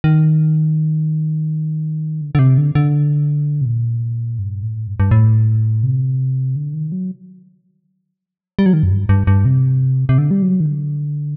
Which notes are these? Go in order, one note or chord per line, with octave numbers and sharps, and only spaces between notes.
D#3
D3
D3
C3
D3
D3
C3
A#2
G2
A2
G2
G2
A2
C3
D3
D#3
F#3
G3
F#3
D#3
F#2
G2
G2
G2
C3
C3
D3
G3
F#3
D#3
D3